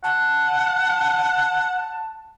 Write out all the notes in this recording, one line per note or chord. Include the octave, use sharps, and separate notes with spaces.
F#5 A5